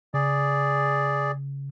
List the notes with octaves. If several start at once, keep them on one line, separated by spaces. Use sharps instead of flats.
C#3 G#4 D5